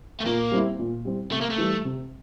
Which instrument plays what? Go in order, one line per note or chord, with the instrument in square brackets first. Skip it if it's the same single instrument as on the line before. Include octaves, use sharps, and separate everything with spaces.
[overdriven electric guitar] A3
[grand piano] A#2 [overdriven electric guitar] A#3
[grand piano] G3 C4 E4
A#2
G3 C4 E4
[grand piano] C3 [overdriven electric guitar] A3
[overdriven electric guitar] A#3
A3
[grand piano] E3 G3
C3